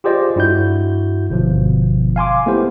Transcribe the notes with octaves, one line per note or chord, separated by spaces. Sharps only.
F4 G4 G#4 C5 D5 D#5
G2 E4 F#4 G6
G1 B2 F3
F5 G#5 C6 D6
A3 B3 E4 G4 C5